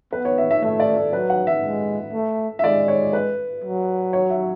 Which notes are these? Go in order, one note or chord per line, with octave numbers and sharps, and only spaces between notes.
B3 B4
C#5
E5
E5
A3 E5
D5
A4
F#3 B4
F#5
E5
G#3
A3
E5
G#3 D5
C#5
B4
F#3
C#5
E5